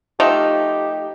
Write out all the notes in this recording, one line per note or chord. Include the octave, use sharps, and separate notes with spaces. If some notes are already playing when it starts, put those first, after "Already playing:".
F3 A3 D#4 G4